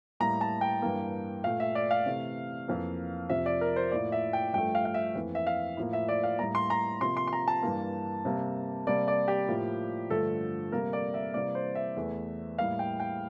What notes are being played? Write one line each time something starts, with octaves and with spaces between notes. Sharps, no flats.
A2 G3 A#3 A#5
A5
G5
G2 E3 A#3
A#2 A3 F5
E5
D5
F5
C3 E3 A3
F2 E3 A#3
F2 C3 F3 E5
D5
A#4
C5
A2 F3 A#3 D5
E5
G5
G2 F3 A3 G5
F5
F5
E5
F2 E3 A#3
E5
F5
A2 F3 A#3
E5
D5
F5
A2 G3 A#3 A#5
C6
A#5
C3 F3 A#3 C6
C6
C6
A#5
A5
G2 E3 A#3
C3 G3 A#3
C3 G3 A#3 D5
D5
G4
A2 F3 A#3
G2 D3 F3 A3 A4
C3 G3 A#3 A#4
D5
E5
C3 E3 G3 A#3 D5
C5
E5
E2 E3 A3
A2 G3 A#3 F5
G5
G5